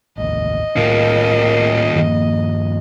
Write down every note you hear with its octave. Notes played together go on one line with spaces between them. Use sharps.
A1 D#2 D#5
D#2 A2 D#3 F4 A#4
G2 D#3 F3 A#3